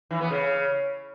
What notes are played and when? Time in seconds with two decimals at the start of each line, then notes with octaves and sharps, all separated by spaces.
0.11 E3
0.20 B3
0.30 C#3